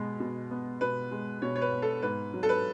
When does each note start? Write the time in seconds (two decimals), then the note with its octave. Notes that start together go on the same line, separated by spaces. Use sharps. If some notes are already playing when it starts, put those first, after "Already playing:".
Already playing: B2 G#3
0.20 B2
0.51 B3
0.81 B2 B4
1.11 G#3
1.42 B2 C#5
1.56 C#5
1.62 B4
1.72 B3
1.82 A4
2.03 G#2 B4
2.33 F#3
2.43 A4
2.49 B4